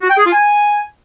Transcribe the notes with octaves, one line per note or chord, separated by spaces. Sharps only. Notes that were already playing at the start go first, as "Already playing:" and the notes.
F#4
G5
G#4
F4
G#5